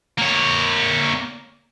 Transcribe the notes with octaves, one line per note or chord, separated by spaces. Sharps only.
A#3 C#5